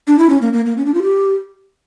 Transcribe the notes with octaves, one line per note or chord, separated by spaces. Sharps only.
D4
E4
C#4
A#3
A#3
A#3
C#4
D4
F4
G4